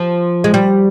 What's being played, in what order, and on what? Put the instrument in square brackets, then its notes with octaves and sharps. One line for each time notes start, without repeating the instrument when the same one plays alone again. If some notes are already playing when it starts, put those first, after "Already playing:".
Already playing: [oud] F3
G#3
G3